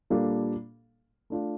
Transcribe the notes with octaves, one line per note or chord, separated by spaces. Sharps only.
A#2 G3 A#3 D4 A4
A3 D4 F4